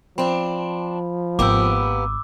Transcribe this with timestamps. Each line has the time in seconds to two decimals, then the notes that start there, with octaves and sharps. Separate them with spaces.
0.18 F3 C4 D4 B5
1.39 G#1 A#3 B3 G4 D6 E6